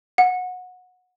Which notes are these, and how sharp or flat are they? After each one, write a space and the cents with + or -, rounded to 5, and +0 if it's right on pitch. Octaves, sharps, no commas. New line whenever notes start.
F#5 -20